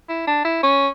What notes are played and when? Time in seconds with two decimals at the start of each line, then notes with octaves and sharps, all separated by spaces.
0.09 E4
0.27 D4
0.45 E4
0.63 C#4